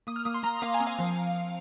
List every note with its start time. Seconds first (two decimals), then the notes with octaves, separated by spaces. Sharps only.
0.07 A#3 D#6
0.16 F6
0.25 A#3 D#6
0.34 C6
0.43 A#3 A#5
0.62 A#3 F5
0.74 G#5
0.80 C4
0.87 F5
0.99 F3